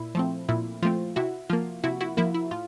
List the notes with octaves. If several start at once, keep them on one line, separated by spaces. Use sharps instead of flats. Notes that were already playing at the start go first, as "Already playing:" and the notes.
Already playing: A#2 E4
F3 A3 C4
A#2 E4
F3 A3 C4 F4
C3 E4 F#4
F3 A#3 F4
C3 E4 F#4
E4 F#4
F3 A#3 E4
E4
A2 F4